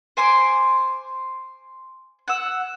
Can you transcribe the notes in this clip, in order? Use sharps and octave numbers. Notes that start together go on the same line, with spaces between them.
C5 G#5 C6 D6
F#5 E6